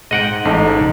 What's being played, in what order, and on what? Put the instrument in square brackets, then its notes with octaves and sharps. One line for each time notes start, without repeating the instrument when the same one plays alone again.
[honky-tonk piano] G#2 [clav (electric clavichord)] D#5 F#5 G5
[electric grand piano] A1 [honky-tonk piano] G#2 A3 A5 [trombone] D#4